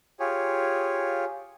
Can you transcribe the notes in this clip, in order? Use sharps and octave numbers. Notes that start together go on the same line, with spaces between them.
F4 G4 G#4 C#5